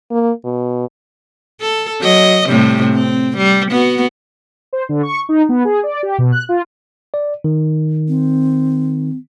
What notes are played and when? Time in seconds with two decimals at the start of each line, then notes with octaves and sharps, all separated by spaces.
0.11 A#3
0.44 B2
1.61 A4
2.01 F#3 D#5
2.48 A2 C3 G3
2.94 C4
3.38 G3
3.71 B3 F#4
4.73 C5
4.89 D3
5.03 C#6
5.29 D#4
5.49 B3
5.65 G#4
5.83 D5
6.03 G4
6.18 B2
6.32 F#6
6.49 F4
7.14 D5
7.44 D#3
8.08 C4